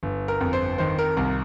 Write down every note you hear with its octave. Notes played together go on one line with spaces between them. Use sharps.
G1
A#4
F2
C5
D#3 C5
A#4
C2 A#4